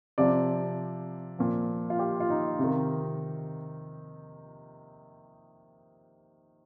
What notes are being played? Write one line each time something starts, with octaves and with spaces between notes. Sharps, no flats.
C3 F3 D5
A#2 F3
F4
G4
F4
D#4
C3 D#3